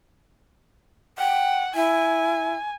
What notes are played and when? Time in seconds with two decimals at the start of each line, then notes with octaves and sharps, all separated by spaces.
1.18 F#5 G5
1.75 E4 G#5